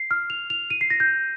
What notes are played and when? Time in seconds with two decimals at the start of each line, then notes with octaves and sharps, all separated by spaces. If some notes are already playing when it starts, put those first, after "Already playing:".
Already playing: C7
0.11 F6
0.30 F7
0.50 F7
0.70 D#7
0.81 C7
0.90 A#6
1.00 G6